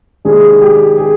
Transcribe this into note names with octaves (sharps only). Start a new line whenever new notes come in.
C3 D#3 G#3 D4 G#4
G4
G#4